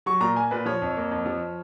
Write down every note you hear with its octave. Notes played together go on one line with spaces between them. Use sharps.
F#3 C#6
A#2 A#5
A#3 G#5
A#2 B4
F3 C#5
F2
A#3
F2
F3